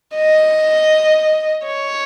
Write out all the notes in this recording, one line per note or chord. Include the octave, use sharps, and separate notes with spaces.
D#5
C#5